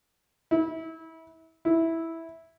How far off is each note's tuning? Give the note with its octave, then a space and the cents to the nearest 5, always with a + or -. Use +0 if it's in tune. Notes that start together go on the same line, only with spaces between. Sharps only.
E4 -25
E4 -5